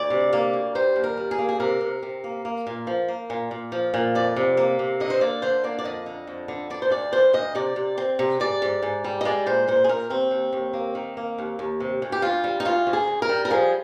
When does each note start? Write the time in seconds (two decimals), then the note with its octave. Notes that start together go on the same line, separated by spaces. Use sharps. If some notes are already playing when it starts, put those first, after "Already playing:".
Already playing: D2 D5
0.10 C3
0.33 A#3
0.54 D2
0.75 G3 C5
0.96 D#2
1.04 A#4
1.17 G3
1.31 G#4
1.39 A#3
1.49 G#4
1.60 C3 A#4
1.81 C3
2.03 C3
2.24 A#3
2.45 A#3
2.67 A#2
2.87 F3
3.08 A#3
3.30 A#2
3.51 A#2
3.72 F3
3.94 A#2
4.15 F2 D5
4.36 C3
4.57 A#3
4.79 C3
5.00 D3 D#5
5.10 C5
5.21 A#3 D5
5.42 D3 C5
5.64 A#3 D5
5.79 D5
5.85 F2 D#5
6.06 D3
6.27 F2
6.48 D3
6.70 D3 D5
6.82 C5
6.90 D2 D5
7.12 D2 C5
7.33 D2 D#5
7.55 C3 D5
7.76 C3
7.98 C4
8.19 C3
8.40 G#2 D5
8.62 G#2
8.82 G#2
9.04 G3
9.21 D#5
9.25 G#3 D5
9.46 A#2 C5
9.67 A#2 C5
9.84 G#4
9.89 A#2 A#4
10.10 D#2 C4
10.31 D#2
10.53 D#2
10.73 A#3
10.95 D#3
11.17 A#3
11.38 D#2
11.59 D#2
11.80 C3
12.02 D2
12.12 G4
12.22 D2 F4
12.44 G3
12.60 D#4
12.65 D2 F4
12.87 D2
12.93 G#4
13.07 D2
13.22 A#4
13.29 G3
13.45 A#4
13.50 F3 G#4